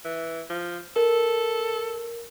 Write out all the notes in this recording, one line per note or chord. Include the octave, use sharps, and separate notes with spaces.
E3
F3
A4 A#4